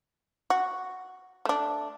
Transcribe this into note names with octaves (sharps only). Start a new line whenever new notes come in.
F#4
A3 D4